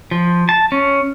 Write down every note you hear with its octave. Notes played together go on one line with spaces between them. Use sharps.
F3
A5
C#4